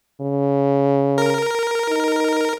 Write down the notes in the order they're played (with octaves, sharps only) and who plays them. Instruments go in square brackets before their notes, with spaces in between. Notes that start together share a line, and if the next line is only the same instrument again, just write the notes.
[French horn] C#3
[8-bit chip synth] A#4
[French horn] D#4